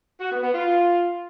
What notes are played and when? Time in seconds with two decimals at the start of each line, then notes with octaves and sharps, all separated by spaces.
0.21 F#4
0.32 B3
0.43 B3
0.54 F4